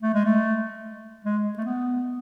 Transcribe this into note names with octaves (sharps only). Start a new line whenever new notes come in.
A3
G#3
A3
G#3
A3
B3